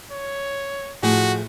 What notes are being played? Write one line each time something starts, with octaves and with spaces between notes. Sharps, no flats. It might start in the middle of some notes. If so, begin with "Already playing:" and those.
C#5
A2 F3 F#4 G#4